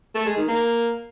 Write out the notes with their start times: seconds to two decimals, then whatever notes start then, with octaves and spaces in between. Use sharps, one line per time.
0.15 A3
0.26 G#3
0.37 D#3
0.48 A#3